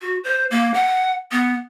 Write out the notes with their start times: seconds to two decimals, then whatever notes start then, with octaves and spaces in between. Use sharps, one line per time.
0.02 F#4
0.24 C5
0.51 A#3
0.74 F#5
1.32 B3